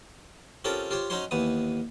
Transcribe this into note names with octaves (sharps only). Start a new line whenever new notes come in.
C4 C#4 F4 G4 A4 A#4
F4 G4 C5 C#5
C#4 D#4 F#4 C5 C#5 C6
D#2 E3 B3 D#6